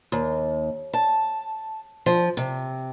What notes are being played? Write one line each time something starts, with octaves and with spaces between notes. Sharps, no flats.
D#2
A5
F3
C3